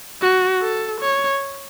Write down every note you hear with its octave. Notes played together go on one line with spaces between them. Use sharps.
F#4
A4
C#5